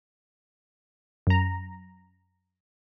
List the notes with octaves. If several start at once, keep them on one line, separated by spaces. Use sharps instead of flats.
F#2 A#5